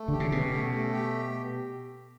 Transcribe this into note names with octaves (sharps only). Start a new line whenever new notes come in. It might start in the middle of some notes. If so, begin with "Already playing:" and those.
Already playing: A3
D3 G4
C#3
B2 C#4
A3
A3
G4